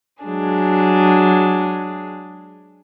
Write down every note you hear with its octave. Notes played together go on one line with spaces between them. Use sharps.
F#3 G#3 D4 G#4